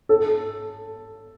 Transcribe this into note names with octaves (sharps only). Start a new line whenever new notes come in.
A4